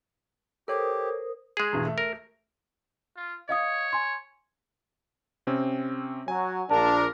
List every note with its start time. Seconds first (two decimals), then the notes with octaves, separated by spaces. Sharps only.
0.68 G4 A4 A#4 C5 C#5 D#6
1.57 G#3 G#4
1.73 E2 G2 B2
1.85 A3
1.98 A#4
3.17 F4
3.49 C#5 D#5 F5 D#6
3.93 G#5 C6
5.47 C3 C4 C#4
6.28 F#3 G#5
6.71 A#1 D4 F4 A#4 A5